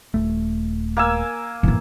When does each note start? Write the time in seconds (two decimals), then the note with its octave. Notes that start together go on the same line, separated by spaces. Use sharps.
0.14 D#1 C#2 A3
0.97 A#3 G#5 E6
1.63 F#2 A2 E3 A#3